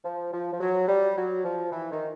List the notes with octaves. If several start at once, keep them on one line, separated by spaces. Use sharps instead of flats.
F3
F3
F3
F#3
G3
F#3
F3
E3
D#3